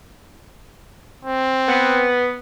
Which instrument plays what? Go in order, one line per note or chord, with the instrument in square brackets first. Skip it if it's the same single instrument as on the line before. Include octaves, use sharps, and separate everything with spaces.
[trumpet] C4
[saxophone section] B3